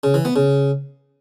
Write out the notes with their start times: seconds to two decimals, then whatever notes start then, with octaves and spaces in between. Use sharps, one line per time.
0.04 C#3
0.14 E3
0.25 B3
0.36 C#3